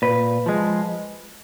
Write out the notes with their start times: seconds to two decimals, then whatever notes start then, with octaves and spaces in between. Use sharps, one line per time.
0.02 A#2 B4
0.46 F3 G#3